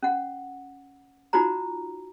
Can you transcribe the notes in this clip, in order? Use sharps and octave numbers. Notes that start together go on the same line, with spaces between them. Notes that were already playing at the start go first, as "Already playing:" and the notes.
C#4 F#5
D#4 F4 F#4 C5 A#5